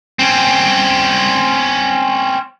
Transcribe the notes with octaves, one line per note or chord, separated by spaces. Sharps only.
C4 C#4